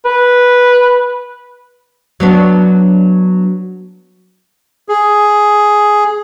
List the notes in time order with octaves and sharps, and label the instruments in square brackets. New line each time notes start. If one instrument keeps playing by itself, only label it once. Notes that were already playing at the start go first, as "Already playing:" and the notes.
[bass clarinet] B4
[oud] F#3 B3 D4
[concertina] G#4